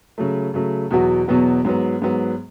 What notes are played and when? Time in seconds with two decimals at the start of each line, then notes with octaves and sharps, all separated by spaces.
0.18 C#3 F#3 A3
0.54 C#3 F#3 A3
0.91 E2 B2 F#3 B3 F#4
1.28 E2 B2 F#3 B3 F#4
1.65 G#2 F#3 B3
2.02 G#2 F#3 B3